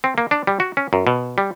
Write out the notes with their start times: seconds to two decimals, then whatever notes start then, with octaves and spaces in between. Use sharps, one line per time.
0.04 C4
0.18 A#3
0.31 D4
0.47 G3
0.60 F#4
0.77 C#4
0.93 F#2
1.07 B2
1.38 G3